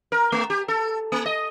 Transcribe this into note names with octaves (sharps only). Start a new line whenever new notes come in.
A#4
A3
G4
A4
A#3
D#5